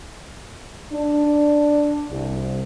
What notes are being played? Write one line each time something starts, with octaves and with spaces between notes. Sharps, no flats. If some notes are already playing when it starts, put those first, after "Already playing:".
D4
C2